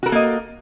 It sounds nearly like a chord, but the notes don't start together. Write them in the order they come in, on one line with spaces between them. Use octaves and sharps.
F#4 A#4 A4 A#3 D#5